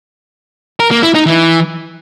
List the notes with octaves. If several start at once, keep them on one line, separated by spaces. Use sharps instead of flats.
A#4
A#3
E4
D#4
E3